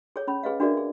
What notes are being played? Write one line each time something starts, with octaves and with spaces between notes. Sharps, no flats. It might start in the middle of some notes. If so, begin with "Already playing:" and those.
G#4 A4 C#5
C#4 B5
G#4 B4 D#5 F5
D4 F#4 G#4 A#4 D5 E5
G#4